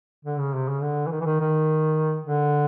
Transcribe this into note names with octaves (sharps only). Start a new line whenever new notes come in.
D3
C#3
C3
C#3
D3
E3
D#3
E3
D#3
D#3
D3